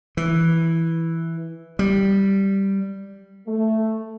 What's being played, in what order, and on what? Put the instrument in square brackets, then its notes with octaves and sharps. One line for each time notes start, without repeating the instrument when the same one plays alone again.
[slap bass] E3
G3
[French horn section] A3